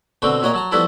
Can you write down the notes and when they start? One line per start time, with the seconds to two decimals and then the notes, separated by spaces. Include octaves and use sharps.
0.22 B2 D3 C4 F#4 G5
0.42 A#2 F#4 C#5 D#5 A#5
0.54 F#3 A5 A#5
0.72 F3 G3 B3 E4 F#4 A4